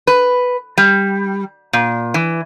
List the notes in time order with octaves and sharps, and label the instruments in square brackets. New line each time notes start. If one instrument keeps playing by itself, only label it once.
[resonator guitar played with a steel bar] B4
G3
A#2
E3